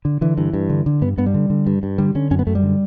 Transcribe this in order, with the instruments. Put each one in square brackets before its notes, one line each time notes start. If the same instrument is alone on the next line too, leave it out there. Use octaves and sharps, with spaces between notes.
[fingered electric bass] D3
D3 E3
G2 E3
G2
D3
D3
G2 B3
G2 B3
G3
D3
D3
G2
G2
D3 G3
D3 C#4
F#2 C#4
B3
F#2 A3
G3
D3